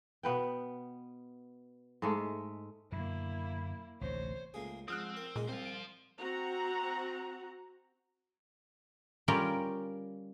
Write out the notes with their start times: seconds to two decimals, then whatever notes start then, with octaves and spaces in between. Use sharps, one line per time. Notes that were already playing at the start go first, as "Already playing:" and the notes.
0.23 B2 B3 B4 G5
2.02 G#2 G#3 A3
2.92 F#2 B2 D3 A#3 E4
4.01 A1 D2 C3 C5 C#5
4.54 C#2 A2 A#3 G#4
4.88 G#2 F3 C4 D#6 F6 F#6
5.17 A#4
5.36 A#2 G#3 C#4 D#4
5.48 C2 C4 E4 C5 F5
5.65 D7
6.19 C4 F#4 F#5 A#5
9.28 G3 C#4 F4 A#4 D5